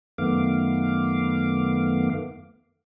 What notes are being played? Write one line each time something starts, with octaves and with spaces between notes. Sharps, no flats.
F#2 D#3 A3 B3 F5 D6